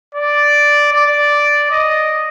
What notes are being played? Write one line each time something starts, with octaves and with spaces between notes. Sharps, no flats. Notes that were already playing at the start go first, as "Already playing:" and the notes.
D5
D5
D#5